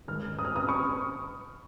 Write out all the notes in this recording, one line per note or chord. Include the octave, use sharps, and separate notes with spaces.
G#2 D#3 F6
D#6
F6
D#6
C#6